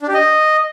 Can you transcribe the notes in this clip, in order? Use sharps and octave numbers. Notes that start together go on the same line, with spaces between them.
D4
G4
D#5